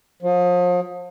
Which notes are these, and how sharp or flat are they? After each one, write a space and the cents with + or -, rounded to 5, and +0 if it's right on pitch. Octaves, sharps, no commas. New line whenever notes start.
F3 +35